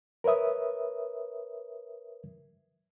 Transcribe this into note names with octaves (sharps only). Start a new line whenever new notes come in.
A#4 B4 C#5 E5 D#6